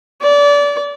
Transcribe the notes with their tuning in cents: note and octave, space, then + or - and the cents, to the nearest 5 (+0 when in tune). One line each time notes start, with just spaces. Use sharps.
D5 -30